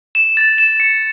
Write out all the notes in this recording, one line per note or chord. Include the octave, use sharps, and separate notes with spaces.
E7
A6
E7
C#7